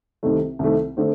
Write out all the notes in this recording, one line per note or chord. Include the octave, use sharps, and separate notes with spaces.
C2 C3 D#3 A3
C2 C3 D#3 A3
D3 A3 C4